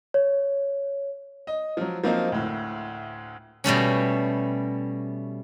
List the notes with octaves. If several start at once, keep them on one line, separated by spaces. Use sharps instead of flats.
C#5
D#5
F3 F#3
F3 F#3 A#3 C4 D#4
D2 A2
B2 G3 A3 C#4